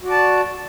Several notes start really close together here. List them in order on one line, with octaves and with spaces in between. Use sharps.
F#4 D5 A5